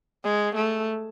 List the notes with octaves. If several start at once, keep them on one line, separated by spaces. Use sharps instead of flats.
G#3
A3